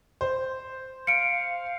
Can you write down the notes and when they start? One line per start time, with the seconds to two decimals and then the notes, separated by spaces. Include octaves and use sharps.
0.21 C5
1.07 F5 C#7 D7